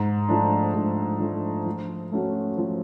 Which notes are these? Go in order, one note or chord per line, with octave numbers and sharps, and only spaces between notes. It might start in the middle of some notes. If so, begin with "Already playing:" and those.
Already playing: G#2
F3 A3 D4
G#2
F3 A3 D4
F3
A3 C#4 F#4
F3